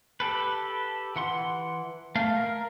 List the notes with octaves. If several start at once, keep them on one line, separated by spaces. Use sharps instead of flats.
G4 A4 B4
E3 F#5 C6
A3 F5
A#4